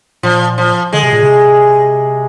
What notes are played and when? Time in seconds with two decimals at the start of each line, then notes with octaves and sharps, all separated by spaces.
0.23 A#2 F3
0.58 F3
0.93 D3 G#3
1.03 C3
1.13 A#2
1.23 C3